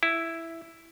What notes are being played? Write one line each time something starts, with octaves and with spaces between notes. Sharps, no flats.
E4